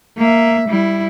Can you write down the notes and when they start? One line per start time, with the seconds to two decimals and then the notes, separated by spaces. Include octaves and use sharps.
0.17 A#3 E5
0.68 G3 E4